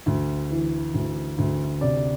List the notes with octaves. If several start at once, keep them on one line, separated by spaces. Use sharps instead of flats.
D2
E3
D2
D2
C3 D5